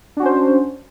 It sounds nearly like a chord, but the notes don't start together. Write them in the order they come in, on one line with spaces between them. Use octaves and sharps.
D4 F#4 C#4 C5